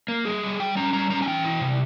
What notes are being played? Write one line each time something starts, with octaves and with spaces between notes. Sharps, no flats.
A#3
G3 G#4
G3
G3 G5
C#4 A#5
G3 A#5
C#4 A#5
G#5
E3 G5
E4
C3